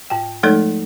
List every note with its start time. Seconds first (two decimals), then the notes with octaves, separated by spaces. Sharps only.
0.10 G#2 G5
0.43 F3 G#3 A3 D#4 A4 C#5